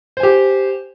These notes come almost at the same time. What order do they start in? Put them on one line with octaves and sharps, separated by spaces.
C5 G#5 G4